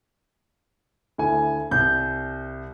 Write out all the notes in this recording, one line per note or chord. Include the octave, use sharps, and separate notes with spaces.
D2 E4 G#5
C2 G6